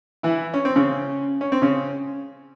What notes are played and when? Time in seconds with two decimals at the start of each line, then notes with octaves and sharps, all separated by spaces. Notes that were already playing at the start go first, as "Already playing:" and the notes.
0.23 E3 E4
0.54 C#4
0.65 C4
0.76 C#3 C#4
1.41 C#4
1.52 C4
1.62 C#3 C#4